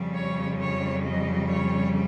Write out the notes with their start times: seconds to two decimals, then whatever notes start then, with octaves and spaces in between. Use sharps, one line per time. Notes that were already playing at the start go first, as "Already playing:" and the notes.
Already playing: F2 C#3 G3
0.16 C#5
0.59 C#5
1.04 D#5
1.49 C#5